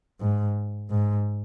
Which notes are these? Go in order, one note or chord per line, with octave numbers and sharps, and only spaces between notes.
G#2
G#2